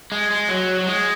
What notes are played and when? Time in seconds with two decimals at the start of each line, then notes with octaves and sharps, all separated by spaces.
0.12 G#3
0.31 G#3
0.49 F#3
0.79 F#3
0.87 G#3